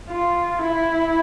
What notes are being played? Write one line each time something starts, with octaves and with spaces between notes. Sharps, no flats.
F4
E4